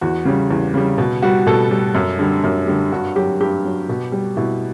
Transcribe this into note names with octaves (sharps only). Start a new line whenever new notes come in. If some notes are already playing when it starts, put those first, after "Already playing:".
E2 F#4
C#3 G3
E2
C#3 G3
B2
G3 F#4
B2 A4
G3
F#2
D3 G3
F#2
D3 G3
G2 F#4
F#3 G4
G2 G4
F#3
B2
G3
B2 E4